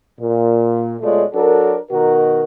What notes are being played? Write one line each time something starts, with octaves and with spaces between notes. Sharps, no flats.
A#2
B2 G#3 A3 F4 C#5 D5
F#3 D4 F#4 A4 A#4
B2 D#3 F#4 A#4